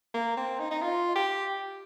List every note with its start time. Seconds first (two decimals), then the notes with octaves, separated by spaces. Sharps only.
0.14 A#3
0.37 C4
0.60 D#4
0.71 D#4
0.82 F4
1.16 G4